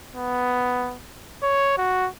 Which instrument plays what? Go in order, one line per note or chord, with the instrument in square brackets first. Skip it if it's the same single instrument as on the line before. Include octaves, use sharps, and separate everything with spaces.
[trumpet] B3
C#5
F#4